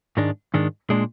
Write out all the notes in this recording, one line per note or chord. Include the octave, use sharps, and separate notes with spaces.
G#2 D#3 G#3 D4
G#2 D#3 G#3 D4
A#2 G#3 D4